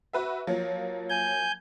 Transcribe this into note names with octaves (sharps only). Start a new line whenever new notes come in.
F#4 B4 E5
F3 F#3 A#3
G#5 G6